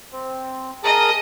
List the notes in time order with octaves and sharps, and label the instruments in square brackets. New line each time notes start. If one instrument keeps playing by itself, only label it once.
[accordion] C4
[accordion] G#4 A#4 A5 [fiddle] D#5